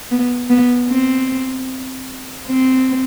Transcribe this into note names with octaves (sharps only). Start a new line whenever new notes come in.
B3
B3
C4
C4